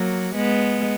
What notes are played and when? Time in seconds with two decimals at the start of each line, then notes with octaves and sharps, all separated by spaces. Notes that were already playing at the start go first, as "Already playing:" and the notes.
Already playing: F#3 A#3
0.36 G#3 B3